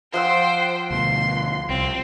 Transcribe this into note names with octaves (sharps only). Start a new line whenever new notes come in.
F3 C5 F#5 G5 E6
D2 B2 C6
C2 C4